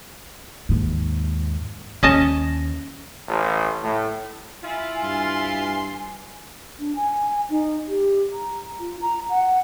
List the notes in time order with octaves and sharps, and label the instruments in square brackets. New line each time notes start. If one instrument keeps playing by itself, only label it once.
[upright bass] D#2 G#2
[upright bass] D#2 [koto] C#4 D#5 A5
[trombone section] A1
A2
[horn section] E4 F4 [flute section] G#5
[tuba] G2 [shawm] C6
[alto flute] D4
G#5
D#4
G4
A#5
F4
A#5
F#5